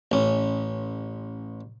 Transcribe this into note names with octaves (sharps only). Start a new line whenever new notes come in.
A1 C#4